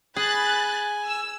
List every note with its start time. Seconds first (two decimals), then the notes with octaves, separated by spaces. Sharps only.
0.16 G#4 G#5 B5 F#6 A6
1.06 E6